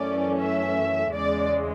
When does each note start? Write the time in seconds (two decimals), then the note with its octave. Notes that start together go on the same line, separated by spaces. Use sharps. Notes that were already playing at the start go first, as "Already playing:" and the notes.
Already playing: F#2 E3 A3 C#4 D5
0.39 E5
1.14 E2 C#3 G#3 D5